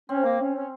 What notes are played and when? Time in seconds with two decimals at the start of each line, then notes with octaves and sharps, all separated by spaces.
0.09 C4 C#4
0.24 A#3
0.40 C#4
0.55 C#4